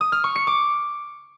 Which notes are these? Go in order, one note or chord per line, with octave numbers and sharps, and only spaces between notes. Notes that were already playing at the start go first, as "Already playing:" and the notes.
D#6
F6
C#6
C#7
D6